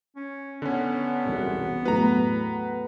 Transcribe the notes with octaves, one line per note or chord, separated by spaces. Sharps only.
C#4
D3 B3 C#4
E1 C2 C3
E2 A2 F#3 B4 A#5